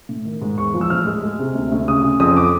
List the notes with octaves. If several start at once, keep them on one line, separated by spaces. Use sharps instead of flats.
A2
D#3
G#2
E2 C#6
F3
E6
A2 F6
G#3
G#3
C3
D2
D2
C#3 D#6
C#3
F2 D#6
D6